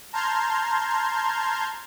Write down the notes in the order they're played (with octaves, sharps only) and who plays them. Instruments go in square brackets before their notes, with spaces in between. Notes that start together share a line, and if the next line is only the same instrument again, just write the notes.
[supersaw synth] A5 A#5 C6 F6 G6 G#6